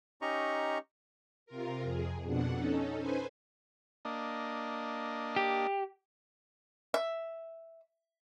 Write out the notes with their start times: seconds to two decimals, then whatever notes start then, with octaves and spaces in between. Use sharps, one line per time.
0.22 C#4 D#4 G4 D#5 A#5 C#6
1.46 C3 F4 A#4
1.82 F2 G#4
2.23 F2 B2 D4 F#5
2.52 C#4 D#4 A4
2.96 B4 C5 G#5
4.05 A#3 D4 D#5
5.36 G4
6.94 E5